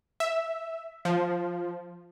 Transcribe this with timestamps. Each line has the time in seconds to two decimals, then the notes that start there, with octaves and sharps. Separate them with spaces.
0.20 E5
1.05 F3